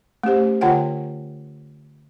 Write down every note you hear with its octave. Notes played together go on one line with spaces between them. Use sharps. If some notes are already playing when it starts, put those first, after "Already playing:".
A3 C#4 G4 C5
D3 F4 C#5 F#5 G5